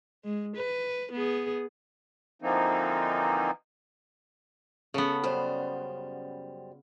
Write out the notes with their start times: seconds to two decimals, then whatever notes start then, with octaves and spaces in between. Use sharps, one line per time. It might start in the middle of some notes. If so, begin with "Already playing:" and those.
0.24 G#3
0.56 B4
1.12 B3 G#4
2.42 D3 E3 F3 A#3 C4 D#4
4.94 C#3 B3 A4
5.24 F#2 G3 C5